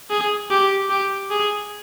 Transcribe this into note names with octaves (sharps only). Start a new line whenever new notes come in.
G#4
G4
G4
G#4